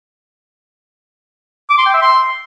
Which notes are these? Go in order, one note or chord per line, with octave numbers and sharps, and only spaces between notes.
D6
C6
G5
E5
C6